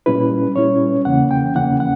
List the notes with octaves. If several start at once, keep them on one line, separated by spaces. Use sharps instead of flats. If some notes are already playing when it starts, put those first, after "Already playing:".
A#2 G3 C#4 E4 B4
A#2 G3 C#4 E4 C#5
E2 C#3 E3 A#3 C#4 F#5
G5
E2 C#3 E3 A#3 C#4 F#5
F#5